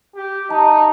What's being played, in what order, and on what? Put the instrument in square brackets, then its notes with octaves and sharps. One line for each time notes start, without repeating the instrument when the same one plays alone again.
[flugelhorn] G4
[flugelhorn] D#4 [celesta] A5